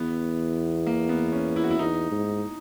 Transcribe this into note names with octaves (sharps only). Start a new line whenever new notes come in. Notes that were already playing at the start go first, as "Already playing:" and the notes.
Already playing: E2 B3
A#3
B3
C#4
E4
F#4
E4
E2 D#4
G#2